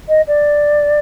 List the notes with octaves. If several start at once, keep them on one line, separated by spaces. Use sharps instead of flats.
D#5
D5